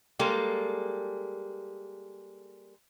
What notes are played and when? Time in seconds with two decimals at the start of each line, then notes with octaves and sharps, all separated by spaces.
0.19 G3 G#3 A#3 A4